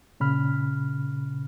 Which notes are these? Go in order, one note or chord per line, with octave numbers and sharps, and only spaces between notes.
A#2 C#3 B5 F6